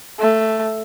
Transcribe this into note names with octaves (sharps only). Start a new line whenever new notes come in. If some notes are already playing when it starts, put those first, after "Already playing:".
A3